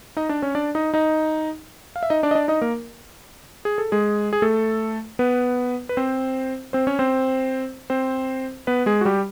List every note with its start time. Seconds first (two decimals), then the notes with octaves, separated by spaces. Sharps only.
0.17 D#4 D#5
0.29 D4 D5
0.42 C#4 C#5
0.55 D4 D5
0.75 D#4 D#5
0.94 D#4 D#5
1.96 F5
2.03 E5
2.10 D#4 D#5
2.23 D4 D5
2.31 D#5
2.35 D4 D5
2.48 D#4 D#5
2.62 A#3 A#4
3.65 G#4
3.78 A4
3.92 G#3 G#4
4.33 G#4
4.42 A3 A4
5.19 B3 B4
5.89 B4
5.97 C4 C5
6.73 C4 C5
6.87 C#4 C#5
6.99 C4 C5
7.90 C4 C5
8.67 B3 B4
8.86 G#3 G#4
9.01 F#4
9.05 G3 G4